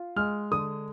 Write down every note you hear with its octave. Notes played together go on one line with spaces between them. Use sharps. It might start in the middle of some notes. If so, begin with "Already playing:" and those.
Already playing: F4
G#3 F6
D3 D#6